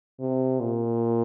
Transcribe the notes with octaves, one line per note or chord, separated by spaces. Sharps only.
C3
A#2